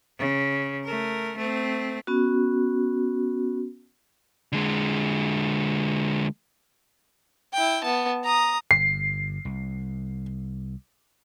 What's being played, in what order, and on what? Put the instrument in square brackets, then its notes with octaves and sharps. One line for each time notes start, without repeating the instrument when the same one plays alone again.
[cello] C#3
A3 A#4
A3 C4
[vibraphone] B3 C#4 F#4
[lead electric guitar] D3 G#3
[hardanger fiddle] E4 G5
B3 A5
A#5 D#6
[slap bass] G1 [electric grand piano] C7
[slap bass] C2